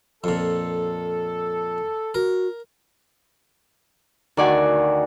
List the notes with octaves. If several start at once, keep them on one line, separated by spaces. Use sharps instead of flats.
F2 A#2 A4
F#4 A#4
D2 D#3 F#4 D5 G#5